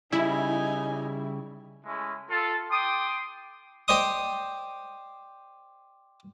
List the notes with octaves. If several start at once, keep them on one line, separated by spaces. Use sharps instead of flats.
C#3 G3 D#4 E4 G#5
G#3 A3 C#4 E4
F4 A4
G5 C6 D6 D#6
G4 C5 D5 D#5 C6 D#6